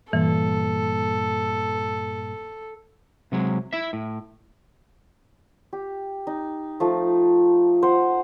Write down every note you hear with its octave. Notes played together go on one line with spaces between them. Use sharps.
G2 A#2 E3 A4
C3 F#3 G#3
E4 E5
A2
G4
D#4
F3 A3
C5 F#5